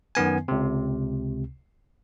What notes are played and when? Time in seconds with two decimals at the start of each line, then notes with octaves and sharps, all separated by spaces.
0.15 F#2 D#3 B3 G#5
0.48 C#2 C3